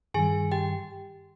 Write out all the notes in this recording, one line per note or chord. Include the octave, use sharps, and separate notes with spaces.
G2 D#3 G3 G#4 G#5
G4 G5